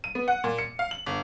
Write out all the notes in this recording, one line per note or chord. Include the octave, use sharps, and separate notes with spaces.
D#7
B3
F#5
A#2
C#7
F5
F#7
G1